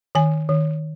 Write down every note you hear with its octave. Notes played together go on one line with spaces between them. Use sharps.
D#3 G#5
D#3